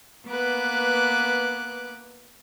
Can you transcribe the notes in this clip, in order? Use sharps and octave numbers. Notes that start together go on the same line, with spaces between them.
A#3 B3 B4 D6 F#6